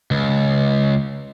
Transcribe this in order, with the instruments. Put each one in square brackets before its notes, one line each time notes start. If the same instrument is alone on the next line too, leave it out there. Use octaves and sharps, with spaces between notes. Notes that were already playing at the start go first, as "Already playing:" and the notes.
[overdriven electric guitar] C#2